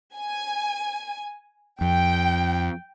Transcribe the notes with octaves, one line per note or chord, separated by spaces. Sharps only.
G#5
F2 G5